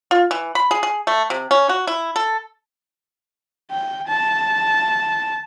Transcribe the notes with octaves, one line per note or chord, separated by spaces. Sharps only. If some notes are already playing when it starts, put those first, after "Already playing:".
F4
E3
B5
G#4
G#4
A3
C3
C#4
F#4
E4
A4
G5
A5